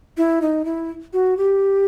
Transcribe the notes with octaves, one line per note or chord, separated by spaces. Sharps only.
E4
D#4
E4
F#4
G4